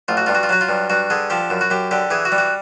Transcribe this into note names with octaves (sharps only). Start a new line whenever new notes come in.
A1 F4
F#4
G2 F4
F#4
F4
F#3 F#4
F4
G2
G2 F#4
D3 G#4
F3 G4
F#2
F#4
F#2 G4
D3 G4
E3 G#4
F#4
G3
F#4